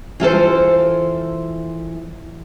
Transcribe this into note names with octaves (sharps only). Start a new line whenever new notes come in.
E3 F4 A4 C5